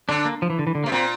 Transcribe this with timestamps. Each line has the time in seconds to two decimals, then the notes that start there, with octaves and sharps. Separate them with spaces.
0.09 D3 D4
0.25 A#3
0.42 F3
0.50 E3
0.59 D3
0.67 E3
0.75 D3
0.84 C3 A#3
0.92 A#2 C4